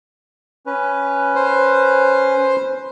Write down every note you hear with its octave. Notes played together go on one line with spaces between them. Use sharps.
C#4 B4
C5